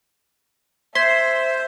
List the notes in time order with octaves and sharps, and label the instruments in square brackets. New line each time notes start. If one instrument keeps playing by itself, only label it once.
[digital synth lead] C5 [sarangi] E5 [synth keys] C6 [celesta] G#6 B6